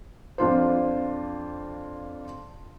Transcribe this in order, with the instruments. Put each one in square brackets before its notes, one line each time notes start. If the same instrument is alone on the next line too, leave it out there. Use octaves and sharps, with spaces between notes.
[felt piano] F2 D4 F4 C5